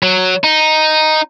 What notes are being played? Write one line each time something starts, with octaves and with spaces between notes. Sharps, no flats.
F#3
D#4